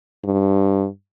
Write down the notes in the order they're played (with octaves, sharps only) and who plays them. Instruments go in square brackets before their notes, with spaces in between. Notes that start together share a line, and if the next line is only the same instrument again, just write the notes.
[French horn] G2